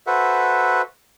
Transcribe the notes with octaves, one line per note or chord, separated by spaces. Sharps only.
F#4 A4 B4 C5 E5 F#5